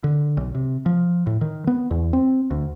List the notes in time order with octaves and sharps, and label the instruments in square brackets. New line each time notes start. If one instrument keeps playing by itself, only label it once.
[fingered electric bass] D3
B1
C3
F3
A2
D#3
B3
E2
C4
D2